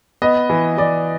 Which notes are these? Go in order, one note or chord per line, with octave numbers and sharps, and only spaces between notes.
B3 D#5
E3
E3 D5